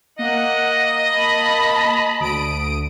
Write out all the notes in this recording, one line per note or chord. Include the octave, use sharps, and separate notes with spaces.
A#3 D#5 F#5
A5 B5
D2 D#6 D7